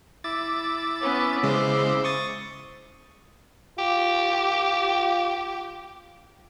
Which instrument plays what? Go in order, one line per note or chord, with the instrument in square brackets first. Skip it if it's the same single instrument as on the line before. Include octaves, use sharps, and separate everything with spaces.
[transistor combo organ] E4 D6 [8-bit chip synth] A6
[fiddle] B3 C#4
[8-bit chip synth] C#3 G#3 [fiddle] C5
[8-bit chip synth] C#6 D#6 A6
[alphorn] F4 [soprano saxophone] G4